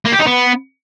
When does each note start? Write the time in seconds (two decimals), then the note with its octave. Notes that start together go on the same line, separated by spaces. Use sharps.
0.06 A#3
0.13 G4
0.20 D#4
0.27 B3